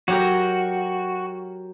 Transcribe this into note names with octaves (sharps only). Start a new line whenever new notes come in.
F#3 F#4 G4 A#4